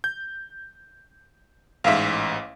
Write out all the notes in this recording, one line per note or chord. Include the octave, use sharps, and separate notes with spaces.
G6
A1 G#2 E5 F5